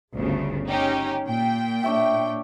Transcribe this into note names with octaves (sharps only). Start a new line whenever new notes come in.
G1 D2 C#3
C#4 D#4 G4
A#2 G5
D4 C#5 E5